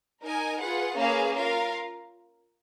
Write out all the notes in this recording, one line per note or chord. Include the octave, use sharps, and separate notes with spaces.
D#4 A#4 D#5 G#5
F4 G#4 B4 F#5
A#3 C#4 G#4 B4 F5
F4 A#4 F5